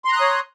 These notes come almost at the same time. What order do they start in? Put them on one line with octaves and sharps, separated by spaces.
C6 A#5 F#6 D#6 C#5